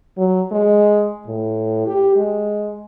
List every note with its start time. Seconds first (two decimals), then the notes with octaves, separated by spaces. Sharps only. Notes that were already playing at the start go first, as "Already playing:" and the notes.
0.17 F#3
0.52 G#3
1.27 A2
1.86 G4
2.16 G#3